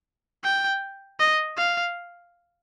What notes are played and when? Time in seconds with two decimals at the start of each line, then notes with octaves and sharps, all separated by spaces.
0.44 G5
1.20 D#5
1.57 F5